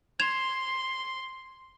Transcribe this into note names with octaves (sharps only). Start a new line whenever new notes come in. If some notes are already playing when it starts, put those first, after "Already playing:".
C6 G#6 E7 F7